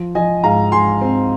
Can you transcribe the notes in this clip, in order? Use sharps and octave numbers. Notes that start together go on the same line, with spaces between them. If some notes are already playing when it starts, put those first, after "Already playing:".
Already playing: F3
F3 D#5 G#5
G#2 F5 A#5
G#2 G#5 C6
C4